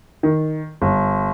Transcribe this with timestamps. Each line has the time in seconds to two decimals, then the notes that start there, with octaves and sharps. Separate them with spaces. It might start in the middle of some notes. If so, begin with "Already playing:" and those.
0.23 D#3
0.82 G1